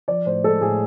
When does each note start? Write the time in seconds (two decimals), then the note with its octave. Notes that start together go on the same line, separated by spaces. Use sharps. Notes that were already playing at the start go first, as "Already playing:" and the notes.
0.08 F3 D5
0.26 A2 C5
0.44 G#3 A4
0.61 A2 G#4